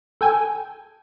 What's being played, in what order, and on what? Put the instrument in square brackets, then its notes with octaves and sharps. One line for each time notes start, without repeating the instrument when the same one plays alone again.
[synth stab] A4 G5 G#5